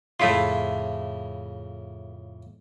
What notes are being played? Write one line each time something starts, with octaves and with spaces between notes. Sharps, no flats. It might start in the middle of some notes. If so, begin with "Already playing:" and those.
F2 A2 C#3 A3 E4 F4